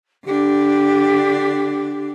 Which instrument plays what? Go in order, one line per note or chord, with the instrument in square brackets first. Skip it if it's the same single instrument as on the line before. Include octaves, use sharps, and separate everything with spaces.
[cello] D3 D4 [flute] G4